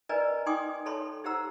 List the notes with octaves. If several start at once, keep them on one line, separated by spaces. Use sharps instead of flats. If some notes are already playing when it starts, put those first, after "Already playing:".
A#4 B4 D5 D#5 G#5 A#5
D#4 G5 G#5 C6 D6 D#6
A4 C#5 A5 B5 C6
D#4 G4 C5 F#5 A#5 E6